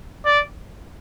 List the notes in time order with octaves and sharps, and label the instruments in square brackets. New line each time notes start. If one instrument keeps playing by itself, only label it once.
[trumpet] D5